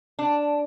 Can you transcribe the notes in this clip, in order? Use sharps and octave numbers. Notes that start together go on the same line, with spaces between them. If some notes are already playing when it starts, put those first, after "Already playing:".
D4